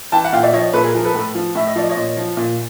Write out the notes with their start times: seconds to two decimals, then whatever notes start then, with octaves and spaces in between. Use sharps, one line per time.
0.12 E3 G5 A5
0.24 F#5
0.33 A#2 F5 G5
0.43 D5 E5
0.53 F3 C#5 D#5
0.73 A#2 A4 B4
0.84 G#4 A#4
0.95 F3 A#4
1.05 A4 B4
1.14 A2
1.35 F3
1.55 A2 E5
1.68 D#5
1.76 F3 D5
1.90 C#5 D#5
1.96 A#2
2.17 F3
2.37 A#2